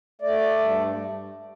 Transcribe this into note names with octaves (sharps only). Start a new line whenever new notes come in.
A3 D5
G2